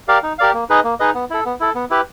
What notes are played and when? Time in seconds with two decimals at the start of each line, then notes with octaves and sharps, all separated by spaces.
0.08 G4 A#4 D5 F5
0.23 D#4
0.39 G4 A#4 D5 F5
0.54 A#3
0.70 D#4 G#4 B4 D#5
0.84 A#3
1.00 D#4 G#4 B4 D#5
1.15 B3
1.30 E4 A4
1.45 B3
1.60 E4 A4
1.75 B3
1.90 E4 G4 B4